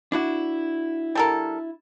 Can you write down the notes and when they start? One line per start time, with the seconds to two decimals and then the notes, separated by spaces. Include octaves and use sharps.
0.12 D4 E4 F#4
1.15 G3 A4 A#4